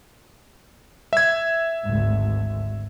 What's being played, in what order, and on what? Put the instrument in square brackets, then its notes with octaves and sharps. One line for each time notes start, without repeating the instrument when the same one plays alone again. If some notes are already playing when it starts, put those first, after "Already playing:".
[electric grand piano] E5 G#6
[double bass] G#1 D2